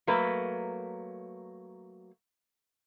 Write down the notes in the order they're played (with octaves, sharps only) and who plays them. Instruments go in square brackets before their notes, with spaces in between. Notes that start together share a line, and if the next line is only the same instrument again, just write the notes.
[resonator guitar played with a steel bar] F#3 A3 A#3 B4